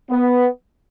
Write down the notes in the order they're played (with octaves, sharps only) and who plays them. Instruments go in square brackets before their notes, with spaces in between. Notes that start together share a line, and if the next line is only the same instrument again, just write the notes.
[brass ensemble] B3